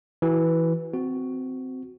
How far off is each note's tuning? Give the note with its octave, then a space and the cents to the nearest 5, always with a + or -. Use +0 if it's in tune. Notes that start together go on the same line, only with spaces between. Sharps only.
E3 -5 F#4 +25
C4 -20 F#4 +0